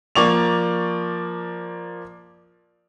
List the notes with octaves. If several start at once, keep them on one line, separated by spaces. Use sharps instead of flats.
F3 A#3 D5 C#6 F7